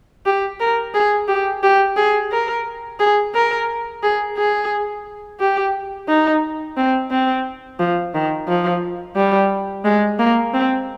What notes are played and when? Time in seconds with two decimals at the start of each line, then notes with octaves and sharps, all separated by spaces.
0.26 G4
0.60 A#4
0.94 G#4
1.28 G4
1.63 G4
1.96 G#4
2.31 A#4
2.99 G#4
3.34 A#4
4.03 G#4
4.37 G#4
5.39 G4
6.09 D#4
6.77 C4
7.11 C4
7.79 F3
8.14 D#3
8.48 F3
9.16 G3
9.85 G#3
10.19 A#3
10.54 C4